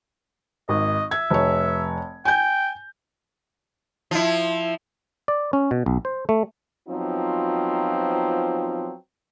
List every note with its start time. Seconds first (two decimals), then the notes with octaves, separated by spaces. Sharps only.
0.69 G#1 D#5
1.11 E5 G#6
1.30 F1 C#5
2.25 G5 G#5 G6
4.11 F3 E4
5.28 D5
5.53 C#4
5.71 B2
5.86 B1
6.05 C5
6.29 A3
6.88 F3 F#3 B3 C4 D#4 F4